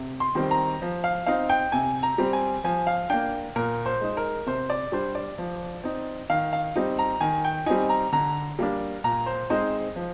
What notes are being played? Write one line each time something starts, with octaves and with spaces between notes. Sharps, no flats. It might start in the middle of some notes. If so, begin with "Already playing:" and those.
Already playing: C3
C6
D#3 G3 C4
A#5
F3
F5
C4 D#4 F5
G5
C3 G#5
A#5
G3 C4
G#5
F3 G#5
F5
A#3 D4 G5
A#2 A#4
C5
G#3 D#4
A#4
C3 C5
D5
G3 D4 C5
D5
F3
C4 D#4
D#3 F5
F5
G3 C4 D#4
A#5
D#3 G#5
G5
G3 C4 D#4 G#5
A#5
D3 A#5
G3 A#3 D4
A#2 A#5
C5
G#3 C4 D#4 C5
F3